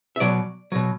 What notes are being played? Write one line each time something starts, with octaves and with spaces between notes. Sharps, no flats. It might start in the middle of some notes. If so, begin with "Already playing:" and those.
E5
B2 F#3 D5
B2 F#3